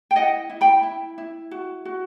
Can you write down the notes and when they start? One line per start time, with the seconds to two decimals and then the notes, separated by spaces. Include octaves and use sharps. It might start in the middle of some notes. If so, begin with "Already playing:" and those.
0.11 G5
0.16 E4 D#5 F#5
0.50 E4
0.61 G5 B5
0.83 E4
1.18 E4
1.51 F#4
1.85 F#4